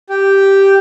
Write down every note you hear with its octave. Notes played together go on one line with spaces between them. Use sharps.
G4